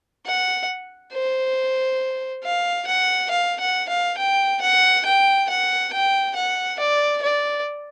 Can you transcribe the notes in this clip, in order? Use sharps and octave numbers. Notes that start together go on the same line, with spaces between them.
F#5
C5
F5
F#5
F5
F#5
F5
G5
F#5
G5
F#5
G5
F#5
D5
D5